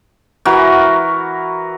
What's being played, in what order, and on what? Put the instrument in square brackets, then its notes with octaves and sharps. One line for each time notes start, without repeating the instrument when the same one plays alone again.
[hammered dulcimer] E3 F#4 A#4